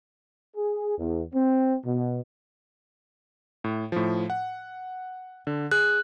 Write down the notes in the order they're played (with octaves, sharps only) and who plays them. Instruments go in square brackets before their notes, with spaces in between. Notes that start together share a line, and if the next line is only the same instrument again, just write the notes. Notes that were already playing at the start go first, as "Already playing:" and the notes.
[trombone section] G#4
E2
C4
B2
[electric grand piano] A2
A2 F3
F#5
D3
[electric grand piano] G#4 [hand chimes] F#6